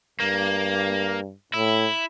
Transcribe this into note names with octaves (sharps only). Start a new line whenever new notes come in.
G2 A#3
A2 E4